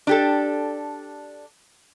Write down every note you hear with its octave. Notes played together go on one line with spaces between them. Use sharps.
D4 G4 A4